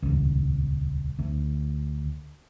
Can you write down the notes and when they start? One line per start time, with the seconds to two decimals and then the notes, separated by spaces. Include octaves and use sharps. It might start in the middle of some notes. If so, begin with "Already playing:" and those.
0.02 D#1 C#2
1.19 D2